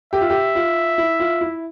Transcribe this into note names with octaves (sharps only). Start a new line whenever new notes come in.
G4 E5
F4
G4
F4
E4
F4
E4